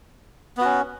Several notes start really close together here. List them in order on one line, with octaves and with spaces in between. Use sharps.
B3 F#4 C#4